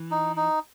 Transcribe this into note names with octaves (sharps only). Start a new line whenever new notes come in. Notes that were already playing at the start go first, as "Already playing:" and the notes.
Already playing: E3
D#4
D#4